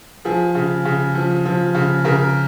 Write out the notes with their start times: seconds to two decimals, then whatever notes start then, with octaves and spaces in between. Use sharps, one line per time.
0.25 F3 G#4
0.55 C#3
0.85 C#3
1.15 F3
1.45 F3
1.74 C#3
2.04 C#3 A#4